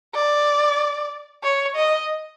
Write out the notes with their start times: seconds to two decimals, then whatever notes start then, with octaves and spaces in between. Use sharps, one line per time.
0.15 D5
1.43 C#5
1.76 D#5